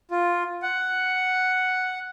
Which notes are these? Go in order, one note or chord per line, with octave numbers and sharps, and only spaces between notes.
F4
F#5